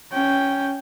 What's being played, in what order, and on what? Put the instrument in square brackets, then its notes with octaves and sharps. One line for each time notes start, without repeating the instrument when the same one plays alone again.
[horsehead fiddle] C#4 G5